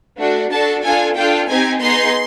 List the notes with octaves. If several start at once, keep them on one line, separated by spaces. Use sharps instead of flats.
A3 D4 F#4
D4 F#4 A4 A5
D4 F4 A4 G#5
D4 F4 A4 G5
C4 D#4 G4 G#5
B3 D#4 G#4 C6